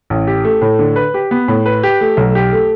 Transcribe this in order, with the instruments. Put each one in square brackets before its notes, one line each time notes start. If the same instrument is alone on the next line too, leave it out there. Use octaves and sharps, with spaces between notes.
[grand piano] A1
G4
A3
A2
D3
B4
G4
B3
A2
B4
G4
A3
B1
G4
A3